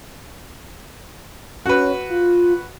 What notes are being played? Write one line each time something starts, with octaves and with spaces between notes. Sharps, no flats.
C#4 F#4 B4
F4